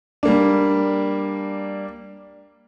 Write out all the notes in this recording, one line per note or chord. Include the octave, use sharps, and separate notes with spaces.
G3 A#3 D4